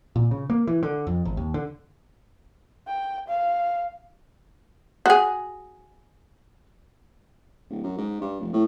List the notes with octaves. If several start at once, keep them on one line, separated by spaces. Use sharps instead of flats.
A#2
C#3
A#3
E3
D3
F2
G#1
D#2
D3
G5
F5
F#4 G#4
D1
F#2
G#2
G2
F1
A2